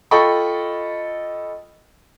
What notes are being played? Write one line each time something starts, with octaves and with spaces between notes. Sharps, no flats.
F4 A4 D#5 G5 B5 C#6